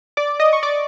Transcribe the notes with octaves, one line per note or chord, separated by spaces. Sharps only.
D5 D6
D#5 D#6
C#6
D5 D6